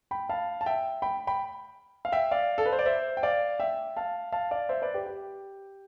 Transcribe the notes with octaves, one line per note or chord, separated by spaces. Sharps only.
G5 B5
F5 A5
A5
E5 G5
G5 B5
G5 B5
F5
E5 G5
D5 F5
A4
B4
C5
D5
C5 E5
G5
D5 F5
E5 G5
F5 A5
F5 A5
D5 F5
C5 E5
B4 D5
G4 B4
G4